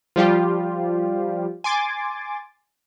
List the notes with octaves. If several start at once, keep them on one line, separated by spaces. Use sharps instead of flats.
F3 G3 F4 G4
G#5 C6 D6 A6